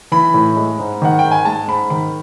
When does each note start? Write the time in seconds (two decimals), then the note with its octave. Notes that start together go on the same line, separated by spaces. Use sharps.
0.12 E3 B5
0.34 A2
0.56 G#3
0.79 G#2
1.02 D#3 F#5
1.19 G5
1.24 G#2
1.31 G#5
1.45 G#3 A5
1.68 G#2 B5
1.90 D#3 B5